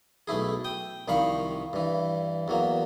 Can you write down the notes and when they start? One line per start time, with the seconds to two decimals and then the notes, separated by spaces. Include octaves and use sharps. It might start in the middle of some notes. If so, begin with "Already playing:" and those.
0.27 B1 A3 E4 G#4
0.64 G5 D#6
1.08 C2 D#3 F3 F5 B5 C#6
1.73 G2 E3
2.48 E2 F#3 A#3